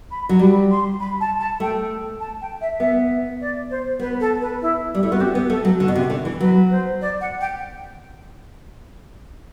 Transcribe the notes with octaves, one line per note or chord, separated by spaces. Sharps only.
B5
F#3
G3 B5
C6
B5
A5
A5
A3 G5
A5
G5
E5
B3 E5
D5
C5
B3 B4
A4
B4
E4
G3
A3 E4
B3 F#4
C4 G4
B3
A3 A4
F#3
D3 F#4
B2
C3
D3
E3
F#3 B4
C5
D5
F#5
G5